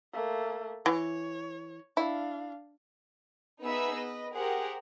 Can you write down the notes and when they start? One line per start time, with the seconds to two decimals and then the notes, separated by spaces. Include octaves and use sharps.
0.13 A3 A#3
0.86 E3 C#5
1.97 D4 E4 F5
3.63 B3 D#4 G#4 B4 E5 E6
3.93 B4 D#5
4.33 G4 G#4 A#4 C5 F#5